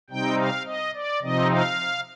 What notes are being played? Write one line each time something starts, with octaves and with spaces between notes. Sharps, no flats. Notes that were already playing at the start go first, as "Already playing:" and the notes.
C3 G3 C4 D#4 G5
F5
D#5
D5
C3 F3 C4 D#4 D#5
F5